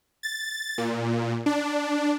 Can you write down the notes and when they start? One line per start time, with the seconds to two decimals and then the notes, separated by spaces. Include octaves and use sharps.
0.23 A6
0.78 A#2
1.46 D4